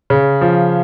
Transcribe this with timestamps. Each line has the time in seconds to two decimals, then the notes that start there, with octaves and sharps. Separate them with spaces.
0.10 C#3
0.41 F3